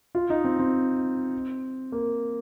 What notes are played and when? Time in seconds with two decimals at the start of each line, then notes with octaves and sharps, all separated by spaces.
0.15 F4
0.30 D#4
0.45 C4
0.59 C4
1.92 A#3